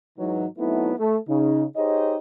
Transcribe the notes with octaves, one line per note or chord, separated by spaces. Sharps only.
G#2 E3 F#3 D#4
F#3 A3 B3 C4 D#4 E4
A3 A4
C#3 D#4
D#4 G4 G#4 C5 C#5 D#5